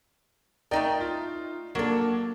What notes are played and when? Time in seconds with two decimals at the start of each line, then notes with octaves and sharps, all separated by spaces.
0.71 A3 D#4 A#4 D5 D#5 G5
1.01 F4
1.75 F#3 A#3 D4 A4